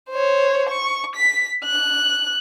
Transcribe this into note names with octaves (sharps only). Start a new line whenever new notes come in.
C5 C#5
C#6
B6
F#6